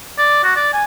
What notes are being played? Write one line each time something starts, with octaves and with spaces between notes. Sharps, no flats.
D5
F#4
D5
G#5